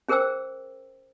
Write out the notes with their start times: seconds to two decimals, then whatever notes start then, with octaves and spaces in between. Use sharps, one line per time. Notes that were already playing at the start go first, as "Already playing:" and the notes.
0.08 C#4 G#4 A#4 C5 G5 E6